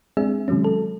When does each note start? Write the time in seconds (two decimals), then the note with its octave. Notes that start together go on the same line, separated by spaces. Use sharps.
0.17 G#3 C4 D4 G#4 E5
0.48 C3 D#3 F#3 G#3 C#4
0.64 F#3 A4